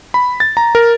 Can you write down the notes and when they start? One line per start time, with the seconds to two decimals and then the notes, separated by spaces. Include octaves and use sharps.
0.14 B5
0.40 A6
0.57 A#5
0.75 A#4